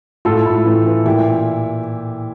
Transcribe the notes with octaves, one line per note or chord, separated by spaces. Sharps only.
A2 F4 A4
A2
E3
E3
A#2 E4 G4